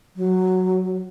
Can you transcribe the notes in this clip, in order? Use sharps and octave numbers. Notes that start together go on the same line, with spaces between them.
F#3